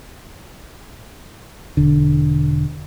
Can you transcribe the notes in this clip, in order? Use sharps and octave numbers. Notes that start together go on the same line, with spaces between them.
E1 D3